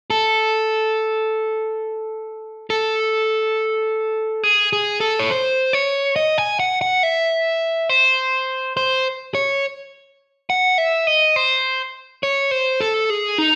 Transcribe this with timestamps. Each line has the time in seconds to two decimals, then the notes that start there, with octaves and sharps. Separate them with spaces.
0.10 A4
2.70 A4
4.44 G#4
4.73 G#4
5.00 A4
5.19 C#5
5.30 C5
5.73 C#5
6.16 D#5
6.38 G#5
6.60 F#5
6.81 F#5
7.03 E5
7.89 C5
8.77 C5
9.35 C#5
10.50 F#5
10.78 E5
11.07 D#5
11.36 C5
12.23 C#5
12.51 C5
12.81 A4
13.10 G#4
13.38 D#4